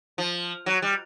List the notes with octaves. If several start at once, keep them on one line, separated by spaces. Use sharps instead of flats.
F3
F#3
G3